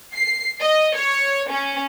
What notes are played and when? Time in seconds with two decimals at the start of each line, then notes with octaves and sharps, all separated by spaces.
0.14 C7
0.60 D#5
0.96 C#5
1.50 C#4